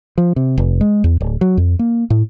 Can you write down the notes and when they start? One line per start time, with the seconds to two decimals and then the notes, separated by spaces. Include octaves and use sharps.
0.18 F3
0.36 C3
0.58 F1
0.81 G#3
1.04 E2
1.21 D1
1.41 F#3
1.57 F2
1.79 A#3
2.10 A2